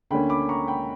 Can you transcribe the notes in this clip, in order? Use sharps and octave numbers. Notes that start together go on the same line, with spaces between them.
D2 D3 A#3 C#4 G5 B5
B5 D6
A#5 C#6
G5 B5